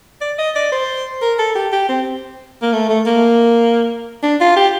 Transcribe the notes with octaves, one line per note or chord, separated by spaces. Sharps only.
D5
D#5
D5
C5
A#4
A4
G4
G4
C4
A#3
A3
A3
A#3
D4
F4
G4